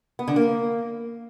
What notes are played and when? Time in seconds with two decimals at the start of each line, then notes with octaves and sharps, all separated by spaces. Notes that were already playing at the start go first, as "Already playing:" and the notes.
0.19 B3
0.28 D3
0.36 A#3